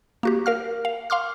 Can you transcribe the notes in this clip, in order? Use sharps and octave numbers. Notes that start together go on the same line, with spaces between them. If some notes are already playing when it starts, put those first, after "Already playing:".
A#3 F#4 G4
A#4 F5 F6
F5
F5 C6 D6 F6